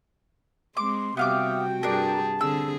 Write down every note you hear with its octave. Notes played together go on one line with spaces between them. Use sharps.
G#3 C4 C6 D6
C3 G3 B3 F#4 E5 F5 G5 D6
G2 D4 G#4 A#4 A5
D3 C4 G#4 E6